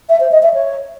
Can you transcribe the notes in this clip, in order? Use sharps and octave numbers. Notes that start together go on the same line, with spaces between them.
E5
C5
D#5
E5
C#5